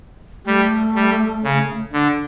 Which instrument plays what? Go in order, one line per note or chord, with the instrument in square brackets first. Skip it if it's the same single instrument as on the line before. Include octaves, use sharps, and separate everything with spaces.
[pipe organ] G3 [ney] A3
[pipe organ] G3
C#3
D3